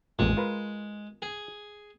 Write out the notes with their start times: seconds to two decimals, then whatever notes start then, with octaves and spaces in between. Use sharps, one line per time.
0.19 A1 F2 A#2 G#3
0.37 F4 A#4 B4
1.22 G#4